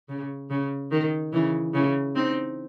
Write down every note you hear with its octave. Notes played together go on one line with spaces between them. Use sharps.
C#3
C#3
D#3
C#3 E3
C#3 E3
C4 D#4